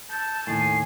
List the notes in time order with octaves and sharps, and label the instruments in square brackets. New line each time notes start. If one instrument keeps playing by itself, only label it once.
[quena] A5 [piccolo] G6
[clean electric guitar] D#2 A2 [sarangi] G#5 [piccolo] C7